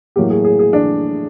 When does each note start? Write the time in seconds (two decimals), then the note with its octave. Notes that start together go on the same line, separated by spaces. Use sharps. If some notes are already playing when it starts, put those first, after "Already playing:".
0.16 A2 F#3 A#3 G4
0.30 G#4
0.44 G#4
0.59 G#4
0.73 D4